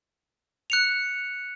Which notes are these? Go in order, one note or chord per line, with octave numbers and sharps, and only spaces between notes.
F#6 C#7 F7